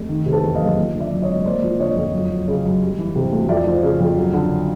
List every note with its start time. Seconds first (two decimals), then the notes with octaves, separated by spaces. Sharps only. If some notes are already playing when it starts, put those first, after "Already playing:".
Already playing: F1
0.09 D#3
0.26 C3
0.32 A4 B4
0.44 E2
0.55 D#5 F5
0.61 F#1
0.78 F3
0.94 D3
1.00 D5 E5
1.11 F#2
1.22 C#5 D#5
1.29 G#1
1.45 A#3 C5 D5
1.63 F3
1.79 D3 C#5 D#5
1.97 F2
2.14 F#2
2.30 F#3
2.48 C#3
2.65 F#2
2.82 G3
2.98 E3
3.15 C3
3.32 D2
3.49 F2 D5 E5
3.67 F3
3.83 C#3
4.00 F2
4.17 F#3
4.33 D3